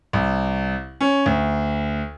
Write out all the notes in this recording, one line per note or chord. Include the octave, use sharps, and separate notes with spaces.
C2
C#4
D2